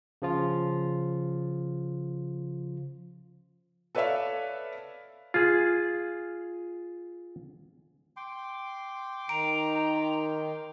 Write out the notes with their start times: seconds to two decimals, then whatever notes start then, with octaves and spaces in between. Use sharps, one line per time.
0.22 C#3 F3 F4
3.95 A4 B4 C#5 D5 E5 F5
5.34 F4 G#4
8.17 G5 C6 D6
9.29 D#3 A#5 D7